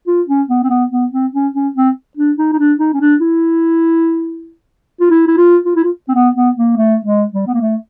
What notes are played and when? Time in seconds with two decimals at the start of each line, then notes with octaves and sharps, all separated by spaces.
0.07 F4
0.28 C#4
0.50 B3
0.64 C4
0.70 B3
0.91 B3
1.12 C4
1.34 C#4
1.54 C#4
1.76 C4
2.17 D4
2.38 D#4
2.53 D#4
2.59 D4
2.79 D#4
2.94 C#4
3.01 D4
3.21 E4
5.00 F4
5.10 E4
5.28 E4
5.37 F4
5.66 F4
5.76 E4
5.84 F4
6.08 C4
6.14 B3
6.36 B3
6.57 A#3
6.77 A3
7.05 G#3
7.34 G3
7.47 B3
7.54 A#3
7.61 A3